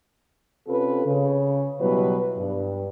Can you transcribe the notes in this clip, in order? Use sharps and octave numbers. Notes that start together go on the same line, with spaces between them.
C3 C4 C#4 F4 A4 B4
C#3
B2 F#3 G3 E4 B4
G2